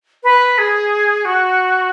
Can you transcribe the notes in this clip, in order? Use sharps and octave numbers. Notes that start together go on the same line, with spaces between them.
B4
G#4
F#4